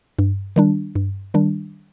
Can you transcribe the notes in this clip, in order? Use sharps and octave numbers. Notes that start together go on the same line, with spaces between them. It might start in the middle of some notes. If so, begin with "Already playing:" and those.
G2
D#3 G3 D4
G2
D#3 G3 D4